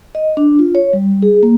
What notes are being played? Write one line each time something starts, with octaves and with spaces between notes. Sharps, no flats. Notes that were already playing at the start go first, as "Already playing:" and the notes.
D#5
D4
F4
C#5
G3
G#4
A#3